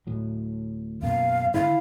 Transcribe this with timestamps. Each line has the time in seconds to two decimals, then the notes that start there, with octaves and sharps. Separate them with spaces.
0.07 D1 A2 F#3
1.03 F#2 B2 A#3 F5
1.54 D3 E4 F5